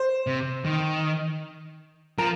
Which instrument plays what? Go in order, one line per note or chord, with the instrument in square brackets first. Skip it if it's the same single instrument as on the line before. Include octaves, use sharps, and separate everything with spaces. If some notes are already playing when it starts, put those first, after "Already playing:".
Already playing: [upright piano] C5
[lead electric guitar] C3
D#3
[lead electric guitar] F3 [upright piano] A#4